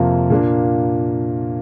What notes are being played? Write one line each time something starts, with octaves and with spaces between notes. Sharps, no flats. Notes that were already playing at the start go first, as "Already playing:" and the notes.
Already playing: F2 C3 A#3 F4
A#2 A#3 D4